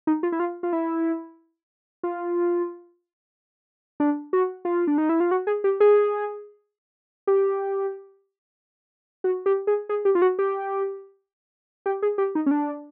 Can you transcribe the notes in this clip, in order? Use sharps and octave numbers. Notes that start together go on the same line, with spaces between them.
D#4
F4
E4
F4
F4
E4
F4
D4
F#4
F4
D4
D#4
E4
F4
F#4
G#4
G4
G#4
G4
F#4
G4
G#4
G#4
G4
F4
F#4
G4
G4
G#4
G4
D#4
C#4
D4